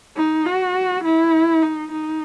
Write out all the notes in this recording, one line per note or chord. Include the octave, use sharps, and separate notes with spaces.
D#4
F#4
E4
D#4
D#4